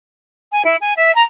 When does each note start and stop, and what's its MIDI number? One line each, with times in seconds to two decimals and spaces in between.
0.52 0.62 80
0.65 0.77 64
0.80 0.94 80
0.97 1.13 76
1.15 1.23 82